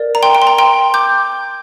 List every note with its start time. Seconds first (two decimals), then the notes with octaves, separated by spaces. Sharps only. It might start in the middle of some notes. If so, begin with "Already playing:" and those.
Already playing: A#4 D5
0.15 A#5
0.23 G5 C6
0.35 G5
0.42 C6
0.47 A#5
0.58 G5 C6
0.94 D6 G6